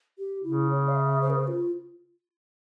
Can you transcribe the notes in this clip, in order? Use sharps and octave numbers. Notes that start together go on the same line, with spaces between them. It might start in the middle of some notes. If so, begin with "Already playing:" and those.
G4
C#3 E4
C#5
F5
E5
C5
A#4
C5
F4